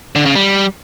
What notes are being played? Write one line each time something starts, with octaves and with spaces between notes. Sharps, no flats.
D3
C#3
G3